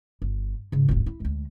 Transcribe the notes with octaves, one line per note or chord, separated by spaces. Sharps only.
G1
G#2 C#3
D#1 G#1
E4
D2 G#3